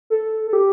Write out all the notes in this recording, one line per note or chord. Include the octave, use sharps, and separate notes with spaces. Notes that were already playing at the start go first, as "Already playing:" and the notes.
A4
A4
G4